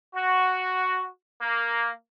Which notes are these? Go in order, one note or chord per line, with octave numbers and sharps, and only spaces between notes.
F#4
A#3